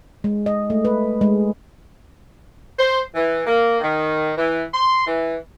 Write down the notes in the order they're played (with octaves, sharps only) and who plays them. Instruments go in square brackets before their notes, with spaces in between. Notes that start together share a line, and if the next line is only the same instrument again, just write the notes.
[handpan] G#3
D#5
A3
B4
G#3
[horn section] C5
E3
A#3
D#3
E3
C6
E3